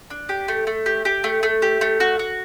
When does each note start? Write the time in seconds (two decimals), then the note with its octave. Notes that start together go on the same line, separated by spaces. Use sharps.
0.10 D4
0.29 G4
0.48 A3
0.67 A3
0.86 G4
1.05 G4
1.24 A3
1.43 A3
1.62 G4
1.81 A3
2.00 F#4
2.19 F#4